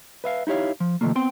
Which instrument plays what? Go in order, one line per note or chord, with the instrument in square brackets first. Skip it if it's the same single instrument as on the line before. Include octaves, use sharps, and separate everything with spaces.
[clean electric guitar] B4 E5 F5
D#4 E4 G4 C#5 F5
F3
C3 D#3 F3 A3 A#3
B3 C4 G5 C6